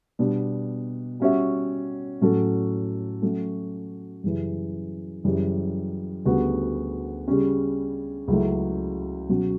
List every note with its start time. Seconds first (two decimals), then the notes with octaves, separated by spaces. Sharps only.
0.19 B2 G3 D4
1.20 G3 C#4 F#4 C#5 E5
2.21 A2 F#3 C#4 F#4 A4
3.22 F#3 A3 C#4 F#4
4.24 F#2 C#3 E3 G3
5.24 F#2 C#3 E3 G3
6.25 D2 C#3 G3 B3 F#4
7.27 C#3 G3 C#4
8.28 C#2 C#3 F#3 A3 E4
9.29 B2 F#3 C#4 F#4